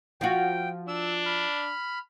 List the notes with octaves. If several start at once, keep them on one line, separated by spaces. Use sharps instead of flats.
F3 F4 F#4 G5
D4 E6
B5 F6